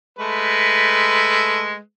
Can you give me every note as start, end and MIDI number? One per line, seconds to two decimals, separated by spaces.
0.19 1.78 56
0.19 1.78 57
0.19 1.78 71